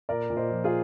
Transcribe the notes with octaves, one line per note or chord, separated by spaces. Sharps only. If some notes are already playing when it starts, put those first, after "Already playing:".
A#2 A#4 D5
A#2
C5 D#5
F3
F4 G#4